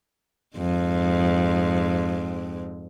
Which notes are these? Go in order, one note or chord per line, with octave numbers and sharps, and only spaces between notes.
F2 G#2